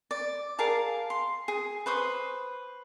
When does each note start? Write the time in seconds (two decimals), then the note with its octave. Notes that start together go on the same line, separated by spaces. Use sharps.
0.11 D5
0.59 G#4 A#4 F5 A5
1.10 C6
1.48 G#4
1.86 B4 C5 C#6 D#6